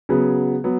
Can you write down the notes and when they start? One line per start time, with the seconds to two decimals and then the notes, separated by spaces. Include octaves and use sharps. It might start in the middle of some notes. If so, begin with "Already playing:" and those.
0.09 C#3 F#3 B3
0.64 F#3 B3